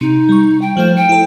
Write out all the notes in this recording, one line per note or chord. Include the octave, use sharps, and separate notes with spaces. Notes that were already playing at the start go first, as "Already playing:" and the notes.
C3 D#4
G3 C#6
G5
F3 A3 C5 F5
G5 C#7
E4 A4